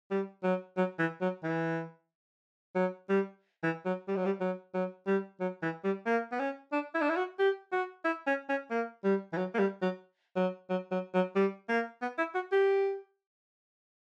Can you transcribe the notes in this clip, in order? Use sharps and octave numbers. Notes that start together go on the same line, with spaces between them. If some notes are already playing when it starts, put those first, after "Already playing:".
G3
F#3
F#3
E3
F#3
E3
F#3
G3
E3
F#3
G3
F#3
G3
F#3
F#3
G3
F#3
E3
G3
A#3
B3
C#4
D4
E4
D4
E4
F#4
G4
F#4
E4
C#4
C#4
A#3
G3
E3
F#3
A#3
G3
F#3
F#3
F#3
F#3
F#3
G3
A#3
B3
E4
F#4
G4